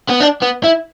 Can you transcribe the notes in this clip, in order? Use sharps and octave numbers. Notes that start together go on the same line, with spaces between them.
B3
D4
B3
E4